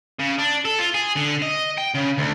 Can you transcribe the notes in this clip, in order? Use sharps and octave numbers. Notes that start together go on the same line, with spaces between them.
C#3
D4
A4
F4
G#4
D3
D#5
G5
C#3
D2